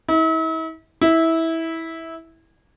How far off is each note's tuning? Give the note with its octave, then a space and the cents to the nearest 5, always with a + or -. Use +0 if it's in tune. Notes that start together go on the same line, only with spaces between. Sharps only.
E4 -40
E4 -15